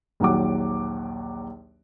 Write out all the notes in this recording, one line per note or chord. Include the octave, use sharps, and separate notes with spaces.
A#1 D#2 F#3 F#5 D6